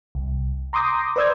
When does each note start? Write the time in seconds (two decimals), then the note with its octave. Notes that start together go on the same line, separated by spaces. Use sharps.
0.15 C2
0.73 A#5 C6 D6 D#6 G6 A#6
1.16 B4 C5 D5 E6 G6 G#6